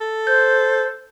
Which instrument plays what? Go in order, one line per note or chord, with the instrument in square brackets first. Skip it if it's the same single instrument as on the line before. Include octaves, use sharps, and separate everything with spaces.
[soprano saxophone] A4
[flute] C5 [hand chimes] G6